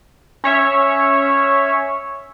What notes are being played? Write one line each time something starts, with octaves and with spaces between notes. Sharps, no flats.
C#4 C#5 E5